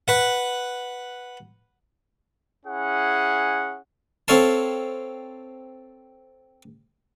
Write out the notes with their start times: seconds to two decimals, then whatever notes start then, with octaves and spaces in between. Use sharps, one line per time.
0.08 B4 F#5
2.66 C#4 E4 G#4 F#5
4.28 C4 A4 C#5 F5 A5